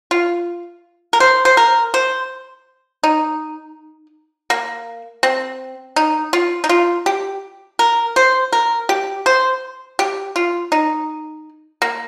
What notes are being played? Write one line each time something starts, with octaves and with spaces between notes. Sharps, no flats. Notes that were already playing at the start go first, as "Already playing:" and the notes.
F4
A#4
C5
C5
A#4
C5
D#4
A#3
C4
D#4
F4
D#4
F4
G4
A#4
C5
A#4
G4
C5
G4
F4
D#4
A#3